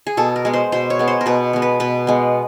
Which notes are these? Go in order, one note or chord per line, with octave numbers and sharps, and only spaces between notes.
G#4
B2 A4
A#4
G#3 B3
C5
B2 C5
C#5
G#3 B3
C5
A#4
B2 B4
G#3 B3
B4
B2 B4
G#3 B3